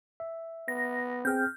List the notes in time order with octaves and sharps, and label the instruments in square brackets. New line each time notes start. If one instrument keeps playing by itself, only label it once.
[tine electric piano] E5
[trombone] B3 [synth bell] A#6
[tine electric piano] C4 G#4 G5 [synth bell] F6 G6